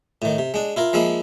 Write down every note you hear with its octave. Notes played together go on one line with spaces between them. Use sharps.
A2 D#3
C3
G#3 D4
E4 F4 A#4
F3 G#3 A#3 E5 B5